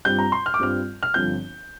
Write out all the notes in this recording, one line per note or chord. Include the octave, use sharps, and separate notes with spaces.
G2 G3 C4 F4 G6
A#5
C6
F6
D6
G2 G3 C4 F4 F6
F6
G1 G2 F3 C4 G6